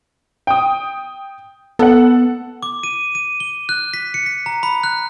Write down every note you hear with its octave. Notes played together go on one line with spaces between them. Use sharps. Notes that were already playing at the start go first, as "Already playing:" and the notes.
G5 D#6
B3 A4 F#5
D6
D#7
D#7
G7
F#6
B6
C#7
B6
A#5
B5
F#6